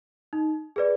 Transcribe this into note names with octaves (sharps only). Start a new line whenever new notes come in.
D#4
G#4 B4 D5